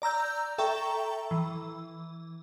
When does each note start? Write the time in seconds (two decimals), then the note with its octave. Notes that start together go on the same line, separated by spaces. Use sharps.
0.02 D5 A#5 E6 G6
0.58 A4 E5 G5 A#5 C#6
1.31 E3